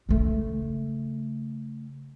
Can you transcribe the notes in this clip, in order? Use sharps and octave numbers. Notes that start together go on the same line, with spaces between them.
C#3 A3